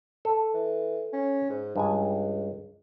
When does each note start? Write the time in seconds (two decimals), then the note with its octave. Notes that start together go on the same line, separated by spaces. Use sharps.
0.25 A4
0.54 E3
1.13 C#4
1.50 G#2
1.76 C#2 G2 G#3 G#5